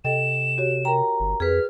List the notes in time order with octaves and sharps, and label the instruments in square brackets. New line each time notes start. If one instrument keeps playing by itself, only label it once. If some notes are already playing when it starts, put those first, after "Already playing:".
[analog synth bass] C3 [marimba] A4 D#5 G5 [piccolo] E7
[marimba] F#4 G4 C#5
[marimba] A#4 G5 [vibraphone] A#5
[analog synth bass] G1
[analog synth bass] F2 [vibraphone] G#4 B4 [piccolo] F6